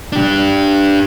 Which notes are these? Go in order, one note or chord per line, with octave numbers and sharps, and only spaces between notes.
D4 G4